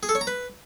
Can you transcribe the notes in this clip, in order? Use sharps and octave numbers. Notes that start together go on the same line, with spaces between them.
G#4
A4
C#5
A#5
B4